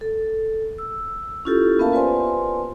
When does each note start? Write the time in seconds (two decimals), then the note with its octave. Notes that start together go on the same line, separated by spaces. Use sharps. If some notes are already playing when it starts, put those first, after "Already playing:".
0.01 A4
0.78 E6
1.45 C#4 E4 F4 G4 A4
1.79 A#3 B3 A#4 E5 F5 A5
1.93 F4 B4 C5 D5 G#5 C6